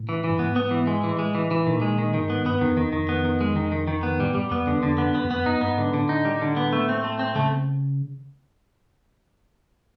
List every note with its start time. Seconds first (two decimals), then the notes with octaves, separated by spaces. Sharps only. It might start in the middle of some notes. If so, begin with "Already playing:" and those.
Already playing: A2
0.09 E3
0.24 E3
0.29 G2
0.39 G#2 B3
0.56 B3
0.71 E3
0.87 G#3
1.03 A2 E3
1.19 G#3
1.35 E3
1.51 E3
1.67 A#2 D#3
1.82 G#3
1.98 D#3
2.14 G2 D#3
2.30 G#2 B3
2.45 G2 B3
2.61 F2 D#3
2.77 E2 D#3
2.93 F2 D#3
3.09 B3
3.25 D#3
3.41 G#3
3.56 D#3
3.72 D#3
3.87 D#3
4.03 B3
4.20 A2 G3
4.35 F#2 G3
4.51 F2 B3
4.67 E2 D3
4.82 F2 D3
4.98 B3
5.04 F#2
5.15 B3
5.25 F2
5.31 B3
5.46 F#2 D#4
5.61 G2 B3
5.78 G#2 D3
5.94 A2 D3
6.09 D#4
6.25 G3
6.41 D3
6.57 B3
6.73 A3
6.89 C4
7.04 A3
7.19 C4
7.35 C#3 A3